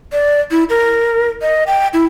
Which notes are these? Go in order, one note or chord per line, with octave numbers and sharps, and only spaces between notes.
D5
E4
A#4
D#5
G5
E4